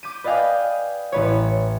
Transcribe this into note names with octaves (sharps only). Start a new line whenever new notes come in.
D6 G6 B6 D#7
B4 D5 D#5 F5 G5 G#5
A1 B4 C#5